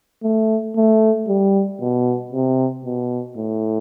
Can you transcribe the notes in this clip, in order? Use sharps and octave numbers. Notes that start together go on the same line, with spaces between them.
A3
A3
G3
B2
C3
B2
A2